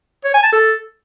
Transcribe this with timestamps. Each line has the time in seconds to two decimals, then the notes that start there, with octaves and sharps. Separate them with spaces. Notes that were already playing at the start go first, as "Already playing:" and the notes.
0.24 C#5
0.34 G#5
0.43 A5
0.53 A4